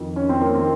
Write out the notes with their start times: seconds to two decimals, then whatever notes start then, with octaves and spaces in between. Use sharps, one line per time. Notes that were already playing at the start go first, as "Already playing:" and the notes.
Already playing: F2 D#3
0.16 C#4
0.29 C4
0.41 A#3
0.55 D#3 C4